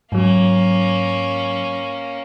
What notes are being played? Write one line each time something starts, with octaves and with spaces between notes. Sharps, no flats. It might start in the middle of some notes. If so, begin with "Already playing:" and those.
G#2 F#3 A#3 C#4